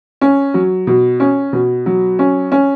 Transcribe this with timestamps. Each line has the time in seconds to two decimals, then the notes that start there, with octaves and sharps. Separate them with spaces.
0.21 C#4
0.54 F#3
0.87 B2
1.20 C#4
1.53 B2
1.86 F#3
2.19 C#4
2.52 C#4